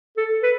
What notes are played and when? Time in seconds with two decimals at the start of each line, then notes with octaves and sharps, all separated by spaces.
0.17 A4
0.43 B4